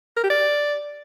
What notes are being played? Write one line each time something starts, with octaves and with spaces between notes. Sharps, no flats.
A#4
G4
D5